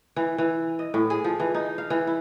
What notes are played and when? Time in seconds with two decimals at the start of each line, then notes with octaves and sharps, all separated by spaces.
0.16 E3
0.38 E3
0.79 D#5
0.94 A2
1.10 G#4
1.24 F3
1.40 E3
1.55 D#4
1.78 F5
1.90 E3
2.07 E4